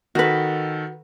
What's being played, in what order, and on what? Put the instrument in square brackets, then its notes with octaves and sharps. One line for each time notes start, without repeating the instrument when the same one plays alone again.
[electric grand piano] D#3 A4 [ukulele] F#4 B4